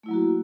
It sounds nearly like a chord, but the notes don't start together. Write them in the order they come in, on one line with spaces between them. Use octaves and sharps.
A3 E4 F#3 A#3 F#4